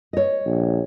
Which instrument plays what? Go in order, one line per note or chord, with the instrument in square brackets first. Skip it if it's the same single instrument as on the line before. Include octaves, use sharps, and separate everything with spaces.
[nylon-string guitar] C#5 D#5
[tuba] A#1